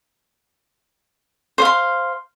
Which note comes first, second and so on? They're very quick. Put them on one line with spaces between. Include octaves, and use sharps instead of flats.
C5 F5 C6